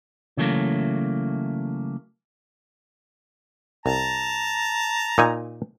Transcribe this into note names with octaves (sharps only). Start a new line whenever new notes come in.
C#3 E3 F#3 A3 A#3
C2 A5 A#5
A#2 D#4 G#5